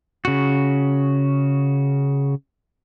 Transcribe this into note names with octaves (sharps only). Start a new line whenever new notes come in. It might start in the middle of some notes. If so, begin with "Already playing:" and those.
C#3 F#4